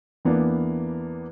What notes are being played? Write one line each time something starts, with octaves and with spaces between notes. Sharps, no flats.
E2 E3 A#3 B3 D4